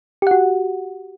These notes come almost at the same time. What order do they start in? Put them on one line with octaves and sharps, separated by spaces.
G4 F#5 F#4